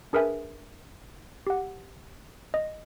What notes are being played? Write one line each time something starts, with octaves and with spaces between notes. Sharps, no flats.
D4 G#4 A#4 B4 E5 G#5
G4 F#5
D#5